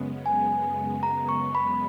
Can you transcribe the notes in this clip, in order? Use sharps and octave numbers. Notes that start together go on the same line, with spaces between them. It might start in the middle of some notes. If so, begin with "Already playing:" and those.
Already playing: F#2 C#3 G#3 B3
G#5
A#5
C#6
B5